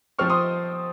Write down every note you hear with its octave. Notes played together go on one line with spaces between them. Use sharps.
F3 C4 C#6 F6
C6 D#6